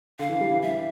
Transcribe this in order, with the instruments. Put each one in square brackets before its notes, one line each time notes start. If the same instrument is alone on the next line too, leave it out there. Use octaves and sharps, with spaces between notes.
[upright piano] D3 [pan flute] F5
[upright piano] E3
G3
E3
[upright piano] E3 [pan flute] E5